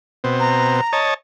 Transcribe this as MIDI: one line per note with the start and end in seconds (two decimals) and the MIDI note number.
0.24 0.81 47
0.24 0.81 60
0.40 0.98 82
0.93 1.14 73
0.93 1.14 75
0.93 1.14 81